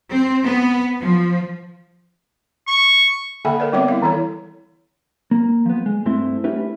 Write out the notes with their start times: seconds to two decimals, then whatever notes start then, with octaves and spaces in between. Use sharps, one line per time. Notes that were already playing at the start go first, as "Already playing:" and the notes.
0.10 C4
0.45 B3
1.01 F3
2.68 C#6
3.45 D3 A#3 A4 E5 G5 B5
3.60 A#4 B4 D5
3.73 G3 B3 C4 C#5 E5 D6
3.88 E4 F5
4.02 E3 E4 A4 C#5
5.31 A#3
5.66 F3 B3
5.86 G#3
6.05 G2 A3 C4 E4 C6
6.44 A3 C#4 E4 G4 B4